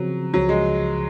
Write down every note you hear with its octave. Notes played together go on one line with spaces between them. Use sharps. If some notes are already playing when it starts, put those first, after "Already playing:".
Already playing: C#3 F3 F#3 C4
C#2 C#3 F3 F#3
G#3